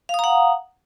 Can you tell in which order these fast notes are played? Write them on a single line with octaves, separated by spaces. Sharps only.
F5 D#6 A#5 F#5